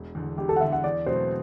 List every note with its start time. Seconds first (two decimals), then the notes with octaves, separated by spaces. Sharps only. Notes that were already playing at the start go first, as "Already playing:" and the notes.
Already playing: E1
0.15 E2 D3
0.38 E1 G4
0.49 A4
0.56 F#5
0.61 E2 D3 E5
0.72 F#5
0.84 E2 D5
1.06 B2 F#3 A3 C4 C5